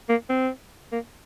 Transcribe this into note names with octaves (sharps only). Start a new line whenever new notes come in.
A#3
C4
A#3